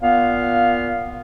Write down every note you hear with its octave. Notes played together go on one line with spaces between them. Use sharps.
A#2 B3 F5